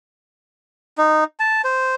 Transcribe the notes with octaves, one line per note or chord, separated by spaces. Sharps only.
D#4
A5
C5